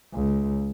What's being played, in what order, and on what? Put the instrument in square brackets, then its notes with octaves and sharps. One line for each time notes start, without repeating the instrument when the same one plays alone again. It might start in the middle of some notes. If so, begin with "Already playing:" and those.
[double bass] C#2